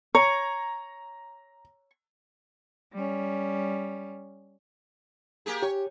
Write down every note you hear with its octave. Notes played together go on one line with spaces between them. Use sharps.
C#5 A#5
G3 C#4
A#3 G4 G#4
G4 C#5